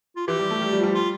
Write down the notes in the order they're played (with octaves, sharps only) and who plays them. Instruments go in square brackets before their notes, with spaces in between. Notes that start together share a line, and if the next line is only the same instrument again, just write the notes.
[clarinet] F4
[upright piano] E3 [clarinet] G4
[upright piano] G3
A3
G3
G3
F3
G3
[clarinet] F4